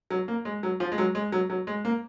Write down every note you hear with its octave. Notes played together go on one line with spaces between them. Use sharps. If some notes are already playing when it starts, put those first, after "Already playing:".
F#3
A#3
G#3
F#3
F3
G#3
F#3
G#3
F#3
F#3
G#3
A#3